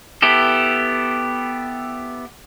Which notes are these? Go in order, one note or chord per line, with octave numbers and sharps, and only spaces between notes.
B3 E4 G4 A4